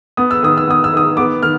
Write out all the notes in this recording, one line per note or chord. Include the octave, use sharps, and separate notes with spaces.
B3 D#6
E6
D#3 D#6
E6
B3 D#6
E6
D#3 D#6
B3 D6
D#3 F6